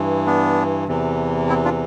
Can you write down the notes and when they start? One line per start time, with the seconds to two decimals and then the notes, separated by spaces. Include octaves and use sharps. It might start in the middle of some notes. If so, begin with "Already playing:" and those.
Already playing: G2 E3
0.26 B3 D4
0.88 E2 C3 E3
1.49 C4 E4
1.65 D4 F4